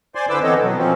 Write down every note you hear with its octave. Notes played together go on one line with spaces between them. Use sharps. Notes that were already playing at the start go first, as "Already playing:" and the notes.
C5 D5 G#5 C6
D3 E4 B4 C5 D6 E6
E3 B3 C4 A4 C#5 D#5
B2 F#3
F3 C4 C#4